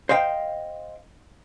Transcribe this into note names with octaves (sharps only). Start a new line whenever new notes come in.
C5 D#5 F5 G5